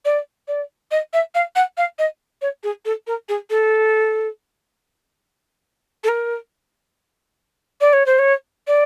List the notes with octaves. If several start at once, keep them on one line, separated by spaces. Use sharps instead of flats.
D5
D5
D#5
E5
F5
F#5
F5
D#5
C#5
G#4
A4
A#4
G#4
A4
A4
A#4
D5
C#5
C5
C#5
D5